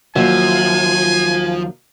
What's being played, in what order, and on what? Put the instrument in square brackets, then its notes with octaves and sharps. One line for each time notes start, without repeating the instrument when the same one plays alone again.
[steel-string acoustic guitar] D#2 F#3 E5 [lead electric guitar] F3 [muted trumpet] G#5